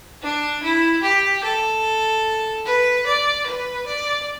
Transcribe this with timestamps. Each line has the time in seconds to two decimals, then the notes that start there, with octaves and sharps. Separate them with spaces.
0.22 D4
0.63 E4
1.03 G4
1.44 A4
2.65 B4
3.06 D5
3.46 B4
3.87 D5